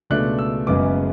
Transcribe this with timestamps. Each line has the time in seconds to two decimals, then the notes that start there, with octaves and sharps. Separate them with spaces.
0.10 C#2 B2 A3 D4 F#6
0.39 E6
0.67 F#1 F#2 C#3 G#3 B3 D6